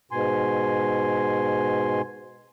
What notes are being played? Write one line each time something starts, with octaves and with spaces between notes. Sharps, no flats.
G#2 B2 G#5 C6